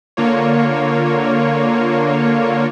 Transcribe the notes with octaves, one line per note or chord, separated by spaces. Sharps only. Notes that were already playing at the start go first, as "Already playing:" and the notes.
D3 A#3 F4 C#5